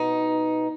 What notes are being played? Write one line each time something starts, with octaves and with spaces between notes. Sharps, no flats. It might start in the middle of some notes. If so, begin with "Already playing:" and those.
Already playing: B2 B3 D#4